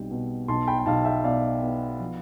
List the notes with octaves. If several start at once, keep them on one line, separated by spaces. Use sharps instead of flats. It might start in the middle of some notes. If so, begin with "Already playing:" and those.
Already playing: B1 G3 C4 G5
B2
B1 A5 C6
G5 B5
G5
B1 F5 A5
E5 G5
B2 D5 F5
B3
F3